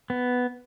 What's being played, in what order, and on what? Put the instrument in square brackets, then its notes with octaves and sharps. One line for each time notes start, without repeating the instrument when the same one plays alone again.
[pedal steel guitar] B3